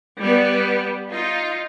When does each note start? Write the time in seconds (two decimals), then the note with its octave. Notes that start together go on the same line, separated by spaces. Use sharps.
0.18 G3 B3
1.09 D#4 F4